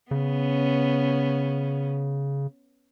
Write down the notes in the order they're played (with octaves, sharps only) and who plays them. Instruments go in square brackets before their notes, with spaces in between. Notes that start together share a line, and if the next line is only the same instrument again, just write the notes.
[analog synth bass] C#3 [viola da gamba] B3 C#4